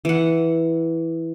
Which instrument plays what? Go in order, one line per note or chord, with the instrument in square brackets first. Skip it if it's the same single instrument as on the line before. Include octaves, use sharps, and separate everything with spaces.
[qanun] E3 F#5